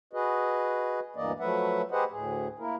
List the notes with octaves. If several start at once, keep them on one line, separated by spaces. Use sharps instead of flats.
F#4 G#4 B4 D#5
D2 G2 E3 A#3 D5 D#5
F3 F#3 A3 B4 E5 F#5
G4 G#4 B4 C5 D#5 F#5
D2 A2 G#4
A#3 E4 A#4